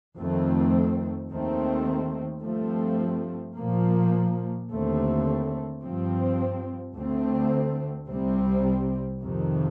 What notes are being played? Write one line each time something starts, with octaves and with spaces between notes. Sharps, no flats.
F2 D#3 A3 C4
D#2 D#3 A3 C4
G2 F3 A3 C4
A#2 F3 A#3
D#2 D3 A3 C4
G2 F3 C4
D2 D3 A3 C4
C2 C3 G3 C4
F2 C3 D#3